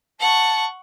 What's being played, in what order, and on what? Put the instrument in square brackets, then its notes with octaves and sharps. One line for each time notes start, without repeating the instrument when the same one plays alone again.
[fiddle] F#5 C#6 [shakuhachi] A5